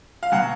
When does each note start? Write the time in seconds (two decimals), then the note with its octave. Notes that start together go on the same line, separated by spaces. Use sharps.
0.23 F5
0.32 B2 F#3 F#5